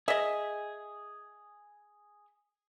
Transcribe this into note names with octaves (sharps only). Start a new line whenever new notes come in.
G#4 D#5 E5